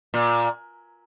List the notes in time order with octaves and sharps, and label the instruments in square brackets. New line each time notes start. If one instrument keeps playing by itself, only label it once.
[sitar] A#2